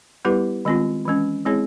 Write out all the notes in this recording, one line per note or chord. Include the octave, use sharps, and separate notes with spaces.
G3 B3 E4 G4 B4
D#3 G#3 C4 F4
E3 G#3 C#4
G#3 C4 E4 G#4 C#5